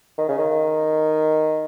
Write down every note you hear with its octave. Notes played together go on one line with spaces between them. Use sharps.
D#3
C#3
D#3